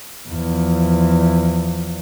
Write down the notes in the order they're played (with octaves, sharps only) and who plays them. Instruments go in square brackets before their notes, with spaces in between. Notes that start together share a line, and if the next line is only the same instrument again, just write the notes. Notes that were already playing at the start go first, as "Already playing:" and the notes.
[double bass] E2 F3